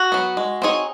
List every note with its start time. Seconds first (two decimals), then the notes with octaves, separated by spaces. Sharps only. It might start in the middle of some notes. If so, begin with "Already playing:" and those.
Already playing: F#4
0.12 F#3 B3
0.37 G#3
0.62 C4 D#4 G#4 C#5